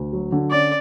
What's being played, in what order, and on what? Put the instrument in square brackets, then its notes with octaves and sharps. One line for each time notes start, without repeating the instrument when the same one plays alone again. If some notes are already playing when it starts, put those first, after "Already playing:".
Already playing: [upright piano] D2
F#3
D3
[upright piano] C#4 [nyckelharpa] D5